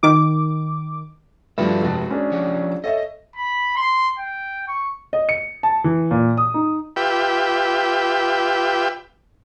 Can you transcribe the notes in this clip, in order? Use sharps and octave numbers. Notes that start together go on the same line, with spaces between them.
D#3 D6
G2 F3 F#4 A4 E5
F1 G#3 F#4 A5
C#4 D4 G#4
F3 G4 C#5
A4 C#5 D#5 E5
B5
C6
G5
C#6
D#5
C#7
A5
E3
A#2
D#6
D#4
F4 G4 B4 E5 G5